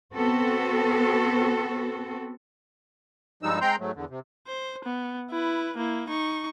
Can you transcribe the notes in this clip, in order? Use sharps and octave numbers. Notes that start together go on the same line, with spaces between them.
B3 C4 F#4 A4
G2 F3 G3 G#3 D#4 E6
G#3 C4 G5 A#5 C6 G6
G#2 F#3 A3
E2 D3
C3
C5
B3
E4 B4
A#3 E4
D#4 C#6